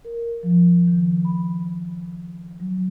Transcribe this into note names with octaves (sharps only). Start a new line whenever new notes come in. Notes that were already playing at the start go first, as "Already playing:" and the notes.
A#4
F3
D#3
B5
F#3